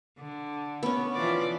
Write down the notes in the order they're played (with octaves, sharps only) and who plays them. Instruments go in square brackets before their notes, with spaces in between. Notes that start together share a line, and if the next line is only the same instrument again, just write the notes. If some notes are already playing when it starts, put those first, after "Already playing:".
[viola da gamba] D3
[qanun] B3 C#4
[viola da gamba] E3 F3 D5